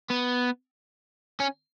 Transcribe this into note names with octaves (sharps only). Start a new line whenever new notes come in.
B3
C#4